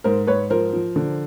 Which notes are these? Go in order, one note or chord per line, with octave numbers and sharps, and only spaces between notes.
G#2 A#4 C5
G#2 B4 C#5
F3 A#4 C5
F3
D3